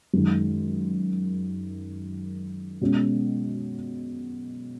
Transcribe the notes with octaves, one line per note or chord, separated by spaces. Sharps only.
F#2 D#3 G#3
B2 G#3 C#4